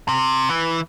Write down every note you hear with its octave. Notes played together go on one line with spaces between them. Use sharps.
C3
E3